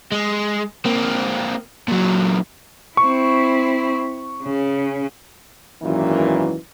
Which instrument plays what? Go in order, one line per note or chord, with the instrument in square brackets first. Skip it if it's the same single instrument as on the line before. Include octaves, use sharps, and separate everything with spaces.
[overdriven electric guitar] G#3
A#3 C4
A#2 F#3
[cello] C4 E4 [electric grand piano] C#6
[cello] C#3
[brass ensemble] G#1 F#2 A#2 D#3 E3